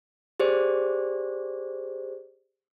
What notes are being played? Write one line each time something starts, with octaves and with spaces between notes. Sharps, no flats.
G4 G#4 C5 D5